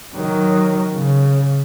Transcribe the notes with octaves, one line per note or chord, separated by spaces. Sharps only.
D#3 F#3
C#3